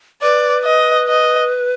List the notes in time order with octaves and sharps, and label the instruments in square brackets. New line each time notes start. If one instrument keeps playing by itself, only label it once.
[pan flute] B4 [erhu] D5
[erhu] D#5
D#5